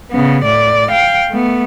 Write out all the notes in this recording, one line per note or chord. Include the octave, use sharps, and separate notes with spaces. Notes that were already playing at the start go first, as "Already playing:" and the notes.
C#3 B3
A2 D5
F5 G5
A3 B3